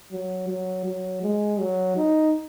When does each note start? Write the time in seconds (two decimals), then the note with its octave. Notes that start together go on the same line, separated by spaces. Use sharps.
0.12 F#3
0.48 F#3
0.86 F#3
1.23 G#3
1.60 F#3
1.97 D#4